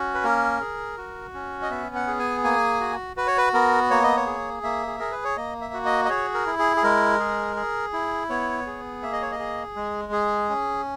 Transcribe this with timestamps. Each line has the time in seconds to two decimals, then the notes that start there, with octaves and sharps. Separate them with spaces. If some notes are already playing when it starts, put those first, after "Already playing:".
Already playing: C#4 F#4
0.14 B4
0.24 A#3 A#4
0.61 G#4
0.98 F#4
1.34 C#4
1.62 D#5
1.70 B3 E5
1.95 F#5
2.07 G#4
2.19 G#5
2.44 A#3 G#5
2.80 F#4
3.17 F#4 B4
3.27 C#5
3.38 B4
3.54 B3 A#4
3.90 A#3 C#5
4.03 D#5
4.17 C#5
4.26 G#4
4.63 A#3 E5
4.87 G#4
4.99 G#4 A#4
5.12 B4
5.24 C#5
5.37 A#3 D#5
5.61 E5
5.74 F#4
5.85 D#5
6.05 D#5
6.09 G#4 C#5
6.34 A#4
6.46 E4
6.59 G#4
6.77 G#4
6.83 G#3 A#4
7.19 G#4
7.56 G#4
7.93 E4
8.29 B3 C#5
8.66 G#4
9.03 A#3 E5
9.12 D#5
9.22 C#5
9.31 D#5
9.39 G#4
9.76 G#3
10.12 G#4
10.50 C#4